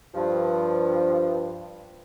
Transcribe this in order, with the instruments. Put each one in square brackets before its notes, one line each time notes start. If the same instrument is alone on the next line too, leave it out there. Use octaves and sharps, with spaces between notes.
[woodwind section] G2 F3